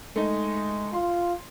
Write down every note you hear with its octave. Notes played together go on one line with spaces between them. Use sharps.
G#3 A3 D#4 D#5
F4 C6